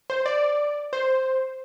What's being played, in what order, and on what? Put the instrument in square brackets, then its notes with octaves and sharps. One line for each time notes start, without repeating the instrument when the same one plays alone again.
[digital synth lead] C5
D5
C5